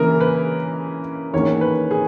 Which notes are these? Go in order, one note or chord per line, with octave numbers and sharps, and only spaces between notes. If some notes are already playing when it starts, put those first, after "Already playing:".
Already playing: C#3 E3 A#3 A#4
B4
E2 D#3 A#3 C#4 C#5
B4
G#4